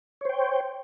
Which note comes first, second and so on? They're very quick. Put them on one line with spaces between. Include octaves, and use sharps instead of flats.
C#5 C5 G5